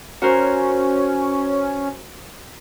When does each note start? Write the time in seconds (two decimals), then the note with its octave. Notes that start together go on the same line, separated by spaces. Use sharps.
0.22 C#4 F#4 A#4 C5